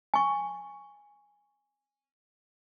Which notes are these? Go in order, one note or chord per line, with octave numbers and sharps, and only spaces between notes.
G#5 C#6